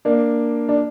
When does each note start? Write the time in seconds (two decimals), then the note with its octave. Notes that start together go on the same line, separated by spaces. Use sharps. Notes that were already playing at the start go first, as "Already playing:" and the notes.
0.05 A#3 D4
0.69 D4